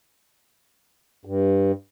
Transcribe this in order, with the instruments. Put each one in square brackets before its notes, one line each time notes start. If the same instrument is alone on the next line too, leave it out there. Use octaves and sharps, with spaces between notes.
[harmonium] G2